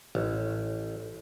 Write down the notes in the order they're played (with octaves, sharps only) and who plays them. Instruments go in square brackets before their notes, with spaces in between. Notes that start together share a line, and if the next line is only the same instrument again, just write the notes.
[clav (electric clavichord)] A1